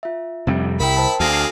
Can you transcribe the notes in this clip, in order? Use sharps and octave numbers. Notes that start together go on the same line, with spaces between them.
F4 E5
F2 C3 G3
C2 E4 A#4 G5 B5
C5 A5
D2 C4 F#4 G#4 A4 F5 A#6